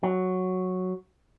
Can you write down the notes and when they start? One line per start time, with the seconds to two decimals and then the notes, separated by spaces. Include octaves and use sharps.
0.03 F#3